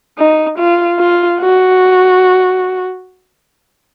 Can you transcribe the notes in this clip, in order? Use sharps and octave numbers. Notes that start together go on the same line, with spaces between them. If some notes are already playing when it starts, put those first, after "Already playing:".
D#4
F4
F4
F#4